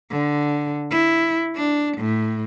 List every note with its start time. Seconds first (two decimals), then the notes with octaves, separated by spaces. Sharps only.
0.11 D3
0.91 E4
1.56 D4
1.98 A2